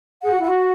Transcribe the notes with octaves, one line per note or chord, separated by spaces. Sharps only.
G#4 F#5
F#4
E4
F#4 F#5